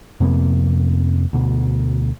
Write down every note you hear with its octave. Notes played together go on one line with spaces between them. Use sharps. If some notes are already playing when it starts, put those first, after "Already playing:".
F2 C3 A#3 B3
D2 B2